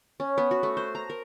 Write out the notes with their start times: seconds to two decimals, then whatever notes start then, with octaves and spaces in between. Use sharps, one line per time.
0.20 C#4
0.38 B3
0.51 F#4
0.63 A3
0.77 C5
0.95 A#5
1.10 A#4